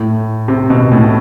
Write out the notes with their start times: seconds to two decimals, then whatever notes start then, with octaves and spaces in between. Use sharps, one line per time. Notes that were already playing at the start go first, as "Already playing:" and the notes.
Already playing: A2
0.48 C3
0.70 B2
0.92 A2